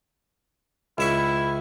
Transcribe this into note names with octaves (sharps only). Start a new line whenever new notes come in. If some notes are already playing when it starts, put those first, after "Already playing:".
C#2 E4 E5 C#6